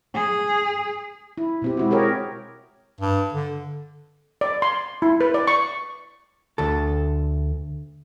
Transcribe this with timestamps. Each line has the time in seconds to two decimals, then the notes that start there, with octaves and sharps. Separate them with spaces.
0.14 G#4
1.38 E4
1.62 B2 C4 G4
1.77 G#3 E4 F#4
1.91 G4 G#4 A#4 C#5
3.00 G2
3.33 D3
4.41 D5
4.62 C6
5.02 E4
5.21 B4
5.34 D5
5.48 C#6
6.58 D2 A4